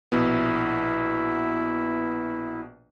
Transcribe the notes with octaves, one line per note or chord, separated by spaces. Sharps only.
A#1 B2 B3 E4